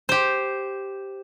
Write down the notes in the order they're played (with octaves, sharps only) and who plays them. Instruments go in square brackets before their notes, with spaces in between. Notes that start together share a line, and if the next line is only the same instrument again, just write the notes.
[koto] G4 C5